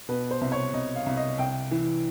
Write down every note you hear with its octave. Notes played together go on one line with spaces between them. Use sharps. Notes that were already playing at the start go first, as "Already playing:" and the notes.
B2 B4
C5
C2
C#5
C2 D#5
F5
C2
D#5
C2 G5
E3